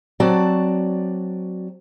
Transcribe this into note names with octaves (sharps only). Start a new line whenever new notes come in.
F#3 C4 F#4 D5 A5